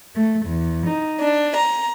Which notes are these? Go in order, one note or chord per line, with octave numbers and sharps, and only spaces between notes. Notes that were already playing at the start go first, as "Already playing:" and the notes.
A3
E2
D#4
D4
A#5